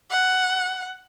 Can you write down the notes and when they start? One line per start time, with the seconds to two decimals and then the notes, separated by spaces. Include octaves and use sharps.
0.11 F#5